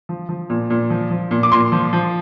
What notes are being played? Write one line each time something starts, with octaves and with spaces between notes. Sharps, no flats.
F3
F3
A#2
A#2
F3
F3
A#2
D6
A#2 C6
F3
F3